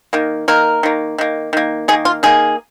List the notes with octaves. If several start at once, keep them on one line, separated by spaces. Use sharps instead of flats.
D#3 A#3
D#3 A#3 A#4
D#3 A#3
D#3 A#3
D#3 A#3
D#3 A#3 G#4
F4
D#3 A#3 G#4